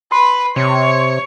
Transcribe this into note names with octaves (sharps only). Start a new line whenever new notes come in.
B4 C6
C3 C#5